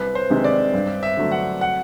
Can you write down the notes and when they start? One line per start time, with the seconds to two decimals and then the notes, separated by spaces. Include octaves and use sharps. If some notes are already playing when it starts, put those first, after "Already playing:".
Already playing: C2 B4
0.15 C5
0.30 C3 D#3 G#3
0.44 D5
0.74 G2
1.03 E5
1.17 D3 F#3 A3
1.32 F#5
1.61 F#5